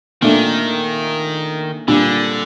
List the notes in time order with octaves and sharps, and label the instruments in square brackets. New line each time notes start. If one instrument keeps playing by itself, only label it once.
[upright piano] A#2 A3 D4 [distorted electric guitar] D#3
[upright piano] A#2 G3 D4 [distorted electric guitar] D3